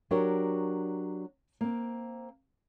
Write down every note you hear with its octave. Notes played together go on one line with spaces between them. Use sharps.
F#3 D4 F#4 G4 A#4 C#5
A#3 C4